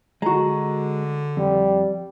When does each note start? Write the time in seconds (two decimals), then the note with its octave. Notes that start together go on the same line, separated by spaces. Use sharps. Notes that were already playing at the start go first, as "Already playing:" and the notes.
0.22 D3 G#3 F#4 A#5
1.37 F2 G3